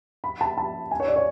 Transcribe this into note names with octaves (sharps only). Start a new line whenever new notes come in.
B5
A5
A5
G#5
C#5
D5
C#5